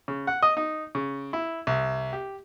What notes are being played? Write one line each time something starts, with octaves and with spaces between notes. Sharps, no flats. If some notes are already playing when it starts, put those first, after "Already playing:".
C#3
F#5
D#5
D#4
C#3
E4
C2
G4